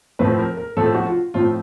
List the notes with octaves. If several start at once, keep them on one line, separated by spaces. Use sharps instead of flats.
A2 F3 A3 C4 B4
A#4
A#4
A2 F3 A3 C4 A4
F#4
F4
A2 F3 A3 C4 F4